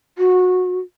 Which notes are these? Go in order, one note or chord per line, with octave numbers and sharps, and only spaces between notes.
F#4